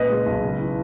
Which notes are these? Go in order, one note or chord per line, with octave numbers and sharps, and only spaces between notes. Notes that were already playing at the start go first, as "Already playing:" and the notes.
Already playing: C#2 A#2 B4 D#5
G#3
B1
C#3
E3